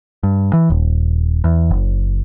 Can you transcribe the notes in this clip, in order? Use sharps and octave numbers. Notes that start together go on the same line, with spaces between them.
G2
E3
D#1
E2
F#1